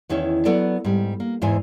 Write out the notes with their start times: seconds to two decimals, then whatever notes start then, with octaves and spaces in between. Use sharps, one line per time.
0.09 E2 D#3 C#4 E4 C#5
0.45 F#3 B3 A4 B4 D5
0.84 G#2 G3
1.20 A#3
1.42 E2 G#2 E3 C5 G#5